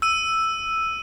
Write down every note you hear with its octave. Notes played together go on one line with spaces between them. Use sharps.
E6 D#7